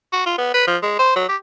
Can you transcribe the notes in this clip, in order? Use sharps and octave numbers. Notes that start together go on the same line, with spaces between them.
F#4
F4
B3
B4
F3
G#3
C5
F#3
G4